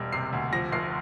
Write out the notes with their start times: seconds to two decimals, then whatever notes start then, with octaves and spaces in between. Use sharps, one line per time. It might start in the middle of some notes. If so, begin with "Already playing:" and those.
Already playing: E1 G3 A#6
0.13 C3 C7
0.33 D2
0.53 F3 A#6
0.72 F1 C7